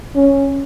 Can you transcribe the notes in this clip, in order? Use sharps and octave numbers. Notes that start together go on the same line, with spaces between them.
C#4